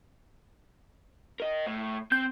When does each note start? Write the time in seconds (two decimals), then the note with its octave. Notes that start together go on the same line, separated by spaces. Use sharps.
1.40 A#4 D#5
1.66 A2
2.12 C4 G6